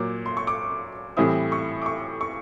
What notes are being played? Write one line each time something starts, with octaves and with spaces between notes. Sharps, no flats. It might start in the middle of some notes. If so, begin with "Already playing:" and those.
Already playing: A#2 F#3 A#3 D6
C6
C#6
D6
A2 E3 G3 C4 E4 D#6
C#6
D6
C#6
C#6